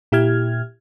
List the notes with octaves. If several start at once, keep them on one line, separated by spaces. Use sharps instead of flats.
A#2 E4 G4 F6 G#6